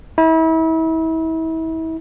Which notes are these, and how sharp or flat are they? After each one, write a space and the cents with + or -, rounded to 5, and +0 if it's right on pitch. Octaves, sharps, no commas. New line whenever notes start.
E4 -35